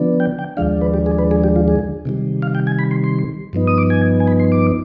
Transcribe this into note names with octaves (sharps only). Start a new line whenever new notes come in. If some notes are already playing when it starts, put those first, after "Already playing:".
Already playing: D3 F3 B3 D4
G5
G5
D#2 D3 F3 G#3 D4 F5
B4
G4
G#4
B4
G#4
G4
F4
G#4
C3 D#3 G3
F5
G5
G#5
B5
C6
C6
G2 F3 B3 D#4
D#6
D6
G#5
G#5
B5
C6
D6